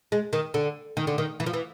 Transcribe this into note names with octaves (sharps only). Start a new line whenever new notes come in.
G#3
D#3
D3
D#3
D3
D#3
E3
F3
E3